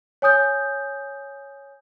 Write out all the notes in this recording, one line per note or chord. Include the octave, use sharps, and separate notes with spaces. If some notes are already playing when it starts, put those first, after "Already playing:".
C#5 G#5 D#6 G6